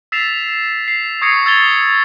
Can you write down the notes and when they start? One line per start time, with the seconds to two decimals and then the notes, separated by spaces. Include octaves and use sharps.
0.12 E6 A6 B6 C7 E7 F7
0.88 C7
1.22 C#6 D#6 G#6 A#6 C7 C#7
1.46 E6 G#6 A6 F7 G7